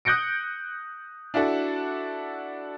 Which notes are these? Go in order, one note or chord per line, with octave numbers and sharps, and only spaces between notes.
D#6 F#6 G6 A#6 C#7 D7
D4 E4 F#4 A4